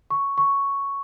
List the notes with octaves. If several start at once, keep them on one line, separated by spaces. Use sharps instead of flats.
C#6
C#6